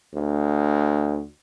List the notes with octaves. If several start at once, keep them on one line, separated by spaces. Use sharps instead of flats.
D2